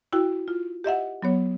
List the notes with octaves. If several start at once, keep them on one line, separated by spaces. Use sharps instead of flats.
E4 F#4 G5
F4
G4 D#5 E5 F#5
F#3 B3 C#5